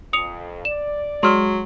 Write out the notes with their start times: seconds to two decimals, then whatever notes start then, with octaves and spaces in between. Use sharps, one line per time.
0.13 F2 D#6 C#7 F7
0.65 D5 E7
1.23 F#3 G#3 C6 F6